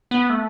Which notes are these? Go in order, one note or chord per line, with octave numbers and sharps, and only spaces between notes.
B3
A3